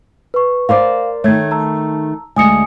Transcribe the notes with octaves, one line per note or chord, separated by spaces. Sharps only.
B4 C#6
A#4 C5 D5 F5
D#3 A3 C#5 G#6
A5 A#5 E6
D2 G#3 G#5 D#6 C#7